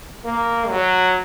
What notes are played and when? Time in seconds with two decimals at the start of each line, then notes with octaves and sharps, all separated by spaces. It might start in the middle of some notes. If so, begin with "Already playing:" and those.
0.25 A#3
0.69 F#3